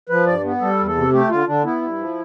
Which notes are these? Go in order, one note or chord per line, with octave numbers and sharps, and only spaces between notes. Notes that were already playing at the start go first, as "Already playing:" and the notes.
F3 B4
G2 D5
B3
G3 A4
E2
A4
C3
A3 G4
D3 F4
D3 D4
B3 E4
G2
F3